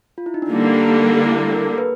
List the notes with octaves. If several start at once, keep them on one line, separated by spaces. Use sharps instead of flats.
F4
E4
D#4
D4
D3 G3 A#3 C#4
D#4
E4
A#4
B4